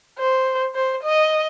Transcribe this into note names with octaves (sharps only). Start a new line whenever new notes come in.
C5
C5
D#5